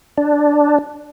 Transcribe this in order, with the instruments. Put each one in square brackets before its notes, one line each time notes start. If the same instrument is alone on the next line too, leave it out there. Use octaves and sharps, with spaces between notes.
[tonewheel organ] D4